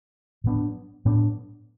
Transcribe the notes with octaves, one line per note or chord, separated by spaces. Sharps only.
A2 F#3 B3 D4
A2 F#3 B3 D4